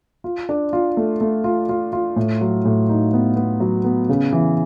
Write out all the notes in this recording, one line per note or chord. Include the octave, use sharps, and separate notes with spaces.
F4
D4
F4
A3
A3
F4
F4
F4
A2
F#3
A2
D#4
B3
B3
F#3
B3
C#3
E3